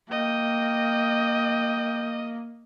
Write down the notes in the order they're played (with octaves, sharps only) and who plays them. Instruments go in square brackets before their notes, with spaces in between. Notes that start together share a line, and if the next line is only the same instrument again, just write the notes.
[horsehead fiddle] A#3 [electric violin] D#5 [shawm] G5